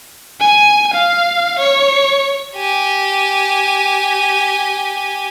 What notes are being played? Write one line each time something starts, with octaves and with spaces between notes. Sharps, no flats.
G#5
F5
C#5
G4 G#5